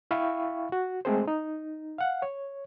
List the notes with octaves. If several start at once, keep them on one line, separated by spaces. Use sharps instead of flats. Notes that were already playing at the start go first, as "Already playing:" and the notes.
E4 E5 F5 G5 B5 C#6
F#4
G#3 A3 C4 G#4 A4 C5
D#4
F5 F#5
C#5